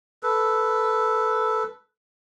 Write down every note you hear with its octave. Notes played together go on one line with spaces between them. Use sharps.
A4 B4